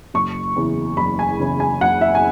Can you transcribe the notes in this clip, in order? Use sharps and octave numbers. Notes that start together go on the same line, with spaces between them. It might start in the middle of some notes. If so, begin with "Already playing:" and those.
F#1 C#6
E2 C#3 E3
F#1 B5
G#5
E2 C#3 E3
G#5
F#1 F#5
E5
G#5